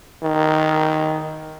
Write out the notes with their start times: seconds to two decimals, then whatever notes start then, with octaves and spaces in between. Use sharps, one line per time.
0.23 D#3